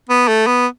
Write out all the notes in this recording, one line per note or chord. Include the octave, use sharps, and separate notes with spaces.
B3
A3
B3